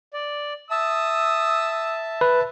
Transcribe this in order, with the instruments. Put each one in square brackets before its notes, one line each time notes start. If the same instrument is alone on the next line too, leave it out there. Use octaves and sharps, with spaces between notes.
[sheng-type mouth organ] D5
[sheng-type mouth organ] E5 A5 [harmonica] D#6 E6
[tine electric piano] B4